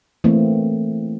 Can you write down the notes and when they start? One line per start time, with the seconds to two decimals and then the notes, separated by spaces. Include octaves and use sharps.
0.24 E3 A3 A#3 C4